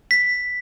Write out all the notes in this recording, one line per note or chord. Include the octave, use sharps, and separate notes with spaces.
B6